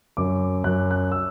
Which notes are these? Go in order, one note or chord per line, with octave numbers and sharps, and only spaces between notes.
F#2 D6
F#2 F#6
F#6
E6